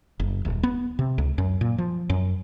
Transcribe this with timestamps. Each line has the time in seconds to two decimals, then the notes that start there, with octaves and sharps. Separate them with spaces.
0.20 F#1
0.45 D#1
0.63 B3
0.99 C3
1.18 C#2
1.38 F#2
1.61 A#2
1.78 F3
2.10 F#2